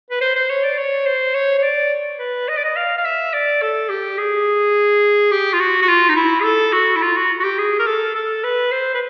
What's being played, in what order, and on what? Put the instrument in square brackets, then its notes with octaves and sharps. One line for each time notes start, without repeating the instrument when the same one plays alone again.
[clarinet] B4
C5
C5
C#5
D5
C#5
C5
C#5
C#5
D5
B4
D#5
D5
D#5
F5
F5
E5
D5
A4
G4
G#4
G4
F4
F#4
F#4
F4
D#4
E4
G#4
A4
F#4
E4
F4
F#4
F#4
G4
G#4
A#4
A4
A4
B4
C5
B4